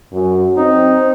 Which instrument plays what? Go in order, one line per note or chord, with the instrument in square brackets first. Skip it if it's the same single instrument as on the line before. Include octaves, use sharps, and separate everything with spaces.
[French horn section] F#2
[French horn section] C4 [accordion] D#4